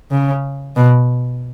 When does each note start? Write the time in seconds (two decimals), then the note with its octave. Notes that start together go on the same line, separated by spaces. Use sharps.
0.11 C#3
0.76 B2